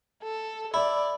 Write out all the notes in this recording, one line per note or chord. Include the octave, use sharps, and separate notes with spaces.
A4
E4 D5